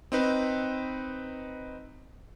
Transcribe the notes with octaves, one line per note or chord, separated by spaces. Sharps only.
C4 D#4 B4